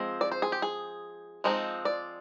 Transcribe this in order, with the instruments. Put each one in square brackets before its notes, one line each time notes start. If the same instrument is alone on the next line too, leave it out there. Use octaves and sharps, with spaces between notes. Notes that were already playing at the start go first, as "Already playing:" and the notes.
Already playing: [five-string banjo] F3 G#3 C4
D5
C5
G#4
G4
G#4
F3 G#3 C4 D#4
D5